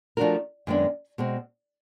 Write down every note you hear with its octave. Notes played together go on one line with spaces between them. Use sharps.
F3 A3 D4 F#4 A#4
F#2 D#3 G#3 B3 D4
B2 G#3 C4